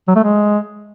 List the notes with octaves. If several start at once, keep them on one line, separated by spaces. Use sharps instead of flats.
F#3
A3
G#3